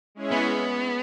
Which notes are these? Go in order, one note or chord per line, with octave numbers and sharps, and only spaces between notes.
G#3 C#4 E4 G#4 C#5
B3